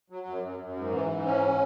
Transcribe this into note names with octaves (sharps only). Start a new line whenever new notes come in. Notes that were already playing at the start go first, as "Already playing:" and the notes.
F#3
F#2
F#2
F#2
G#2
E3
G#2
C#4